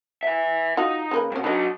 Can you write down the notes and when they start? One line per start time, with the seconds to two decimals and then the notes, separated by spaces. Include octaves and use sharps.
0.23 B4 E5
0.77 D#4 F4 F#4
1.11 C#3 A#3 B4
1.32 G#2 B2 A#3 C#4
1.44 F#3 D4 D#4 B4 D#5